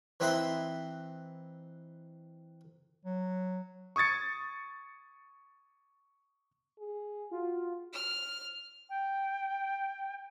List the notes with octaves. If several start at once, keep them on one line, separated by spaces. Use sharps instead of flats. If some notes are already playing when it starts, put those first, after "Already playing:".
E3 C4 D#4 B4 E5 C6
F#3
C#6 D#6 G#6 A6 C#7
G#4
F4 F#4
F6
G5